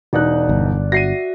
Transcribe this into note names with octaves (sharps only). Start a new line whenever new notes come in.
E1 D#4 D5 F#6
G1
F#4 E5 A#6 C7 D#7